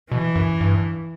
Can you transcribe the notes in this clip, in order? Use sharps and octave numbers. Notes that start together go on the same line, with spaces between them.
B2 E3
F#2
G2